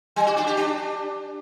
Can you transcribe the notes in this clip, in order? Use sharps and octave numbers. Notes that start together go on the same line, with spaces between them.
G3
F#4
D4
G4
D4